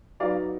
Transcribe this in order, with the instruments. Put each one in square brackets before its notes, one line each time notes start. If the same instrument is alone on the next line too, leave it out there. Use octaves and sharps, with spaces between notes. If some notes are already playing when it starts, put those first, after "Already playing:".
[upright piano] F#3 B3 D#4 D5 F5